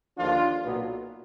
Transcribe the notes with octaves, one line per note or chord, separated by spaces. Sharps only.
D#2 D3 F3 D4 F4
B1 A#2 F#3 B3